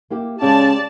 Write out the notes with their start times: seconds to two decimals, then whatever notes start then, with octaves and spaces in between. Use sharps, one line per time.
0.10 A#3 E4 G4
0.42 C#3 G#3 G4 D5 A5